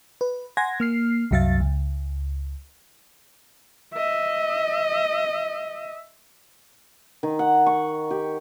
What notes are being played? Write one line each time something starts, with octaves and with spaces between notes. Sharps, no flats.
B4
F#5 G#5 C6 G#6 A#6
A#3 F6 C7
C2 F#2 F#3 E5 F5 A6
C#2
D#5 E5
D#3
F#5
C#6
G4